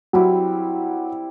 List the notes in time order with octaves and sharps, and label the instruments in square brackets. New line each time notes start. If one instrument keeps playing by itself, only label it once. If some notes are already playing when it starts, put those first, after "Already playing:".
[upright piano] F#3 [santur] G3 C4 E4 G4